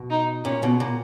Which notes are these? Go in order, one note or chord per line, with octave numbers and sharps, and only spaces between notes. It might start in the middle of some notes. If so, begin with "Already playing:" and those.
Already playing: B2
D#4
A#2 C#4
B2
A#2